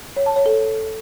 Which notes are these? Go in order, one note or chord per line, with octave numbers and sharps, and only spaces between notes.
C#5
A5
C#5
A4